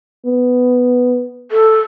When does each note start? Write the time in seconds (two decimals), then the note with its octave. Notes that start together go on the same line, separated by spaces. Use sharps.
0.26 B3
1.51 A4